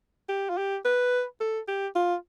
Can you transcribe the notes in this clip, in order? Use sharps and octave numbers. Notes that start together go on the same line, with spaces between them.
G4
F4
G4
B4
A4
G4
F4